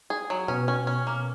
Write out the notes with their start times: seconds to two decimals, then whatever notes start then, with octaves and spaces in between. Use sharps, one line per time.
0.10 G#4
0.30 F#3
0.48 B2 B3 C#4
0.68 C#4
0.87 C#4
1.07 A#3